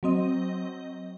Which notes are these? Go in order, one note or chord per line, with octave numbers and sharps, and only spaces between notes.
F#3 C4 D#5